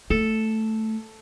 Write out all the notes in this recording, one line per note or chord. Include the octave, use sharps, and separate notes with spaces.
A3 A4